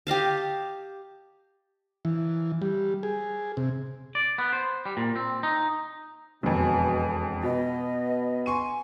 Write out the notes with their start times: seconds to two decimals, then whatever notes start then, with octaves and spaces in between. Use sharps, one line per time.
0.07 G4 D#5 F5 A5
2.05 E3
2.62 G3
3.03 G#4
3.57 C3
4.15 D5
4.38 B3
4.53 C5
4.85 G3
4.97 A#2
5.16 C4
5.43 D#4
6.43 E1 F2 B2 G#5
7.43 B2 B3 D#5
8.46 G#5 C6 C#6 D#7